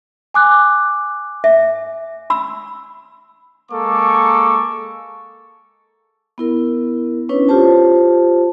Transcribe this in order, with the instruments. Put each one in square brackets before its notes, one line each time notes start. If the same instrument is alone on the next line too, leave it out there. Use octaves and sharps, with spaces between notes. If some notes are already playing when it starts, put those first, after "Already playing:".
[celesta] G#5 D6 F#6
[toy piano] E5
B5 E6
[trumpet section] G#3 A#3 A4 C#6 D6
[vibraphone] B3 E4 A#4
C#4 D4 E4 B4 C#5
F4 G4 C5 A5